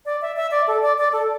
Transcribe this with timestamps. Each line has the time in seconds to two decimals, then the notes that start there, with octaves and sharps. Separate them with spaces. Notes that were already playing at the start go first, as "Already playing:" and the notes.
0.06 D5
0.22 E5
0.36 E5
0.51 D5
0.67 A4
0.82 D5
0.98 D5
1.12 A4